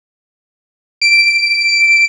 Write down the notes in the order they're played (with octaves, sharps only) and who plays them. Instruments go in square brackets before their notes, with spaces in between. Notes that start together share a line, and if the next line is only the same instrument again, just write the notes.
[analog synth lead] D7